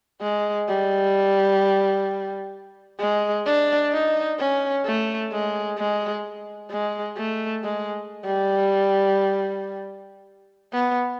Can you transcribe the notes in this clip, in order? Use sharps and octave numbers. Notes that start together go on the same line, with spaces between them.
G#3
G3
G#3
D4
D#4
C#4
A3
G#3
G#3
G#3
A3
G#3
G3
B3